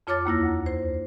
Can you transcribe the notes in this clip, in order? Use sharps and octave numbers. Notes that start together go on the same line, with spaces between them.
F2 F4 C#5 D6 F6 A6
D#2 A#3 E4 A#6
D2
C5